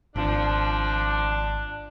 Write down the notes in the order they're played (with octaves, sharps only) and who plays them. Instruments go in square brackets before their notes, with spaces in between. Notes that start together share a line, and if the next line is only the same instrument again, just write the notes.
[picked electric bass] G#1 [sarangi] F3 [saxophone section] D4